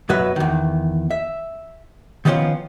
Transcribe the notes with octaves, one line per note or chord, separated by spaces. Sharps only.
F#2 B2 F#3 F#4 B4 E5
E2 D#3
E5
D#3 F3 G3 B3 C#4 F4